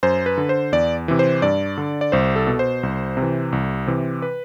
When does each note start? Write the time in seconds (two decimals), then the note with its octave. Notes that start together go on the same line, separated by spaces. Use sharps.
0.03 F#2 C5
0.26 B4
0.38 D3
0.49 C5
0.72 E2 D5
1.08 C3 E3
1.19 C5
1.42 G2 D5
1.78 D3
2.01 D5
2.12 C2 C5
2.36 A4
2.47 B2
2.59 C5
2.83 C2
3.17 C3
3.22 E3
3.52 C2
3.87 C3 E3
4.22 B4